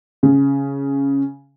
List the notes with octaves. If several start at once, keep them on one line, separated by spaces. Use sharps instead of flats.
C#3